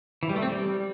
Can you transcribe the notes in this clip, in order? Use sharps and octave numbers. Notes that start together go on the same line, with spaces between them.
E3
G3
A3
C4
G3